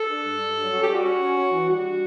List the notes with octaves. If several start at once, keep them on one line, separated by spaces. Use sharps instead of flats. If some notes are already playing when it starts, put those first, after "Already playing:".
Already playing: A4
D4
G2
G2
F#3
C#4 F#4
G4
G3 F#4
C#4
C#4
C#4
E3
G3 F#4
D4